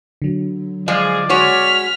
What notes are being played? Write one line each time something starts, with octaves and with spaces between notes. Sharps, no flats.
D3 F#3
F3 G#3 G#4 D5
G#3 F#4 C#5 F6 B6